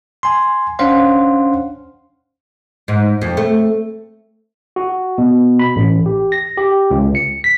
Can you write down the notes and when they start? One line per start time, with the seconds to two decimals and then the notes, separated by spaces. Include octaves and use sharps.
0.23 G#5 C6
0.79 C#4 D4 C5 F5 F#5 C6
2.88 G#2
3.22 F2
3.37 A3
4.76 F#4
5.18 B2
5.59 B5
5.76 A1
6.06 G4
6.32 A#6
6.57 G4
6.91 C#2
7.15 C#7
7.44 B6